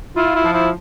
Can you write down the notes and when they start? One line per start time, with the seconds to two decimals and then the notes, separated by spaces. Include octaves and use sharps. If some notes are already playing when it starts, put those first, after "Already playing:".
0.16 E4 F4
0.35 E4
0.44 F3
0.53 E4